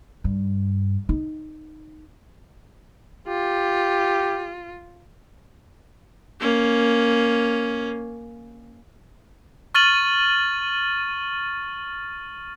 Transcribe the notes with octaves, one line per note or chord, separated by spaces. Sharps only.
G2
D#4
F4 G4
A#3 C#4
C#6 F6 A6 D#7 F#7